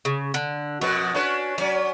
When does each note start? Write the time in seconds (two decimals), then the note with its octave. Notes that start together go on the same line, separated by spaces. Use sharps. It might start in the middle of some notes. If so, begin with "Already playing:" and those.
0.05 C#3
0.34 D3
0.81 F2 B2 F#4 B4
1.14 C#4 D4 B4
1.58 F#3 C#4 D5